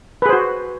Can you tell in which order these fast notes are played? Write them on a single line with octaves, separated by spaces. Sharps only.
B4 G#4 C5 F#4